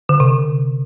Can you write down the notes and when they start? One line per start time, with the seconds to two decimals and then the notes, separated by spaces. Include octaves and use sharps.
0.09 D3
0.20 C3